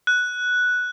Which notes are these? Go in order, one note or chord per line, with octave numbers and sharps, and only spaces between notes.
F#6